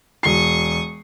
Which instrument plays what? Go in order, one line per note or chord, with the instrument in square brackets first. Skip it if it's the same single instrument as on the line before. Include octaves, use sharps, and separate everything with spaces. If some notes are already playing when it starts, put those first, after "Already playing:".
[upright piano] E1 C7 [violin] C#6 D#6